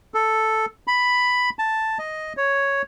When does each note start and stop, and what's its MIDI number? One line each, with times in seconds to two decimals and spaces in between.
0.14 0.66 69
0.87 1.50 83
1.59 1.98 81
1.99 2.33 75
2.37 2.82 73